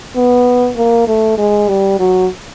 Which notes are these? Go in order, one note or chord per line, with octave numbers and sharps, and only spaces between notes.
B3
A#3
A3
G#3
G3
F#3